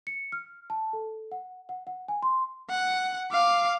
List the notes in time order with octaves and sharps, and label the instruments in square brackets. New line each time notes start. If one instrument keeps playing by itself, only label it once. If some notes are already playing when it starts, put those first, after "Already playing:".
[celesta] C#7
F6
A5
A4
F#5
F#5
F#5
G#5
C6
[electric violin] F#5
F5 D6